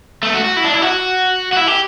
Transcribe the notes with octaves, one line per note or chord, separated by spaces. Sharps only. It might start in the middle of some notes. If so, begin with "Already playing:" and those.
A3
F#4
F#4
E4
D4
E4
F#4
F#4
E4
G4